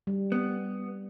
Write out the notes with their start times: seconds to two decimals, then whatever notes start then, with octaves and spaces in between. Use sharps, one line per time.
0.07 G3
0.32 B3